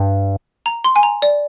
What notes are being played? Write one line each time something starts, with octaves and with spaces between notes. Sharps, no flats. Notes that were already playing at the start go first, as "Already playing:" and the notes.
Already playing: G2
A#5
C6
G#5
A#5
D5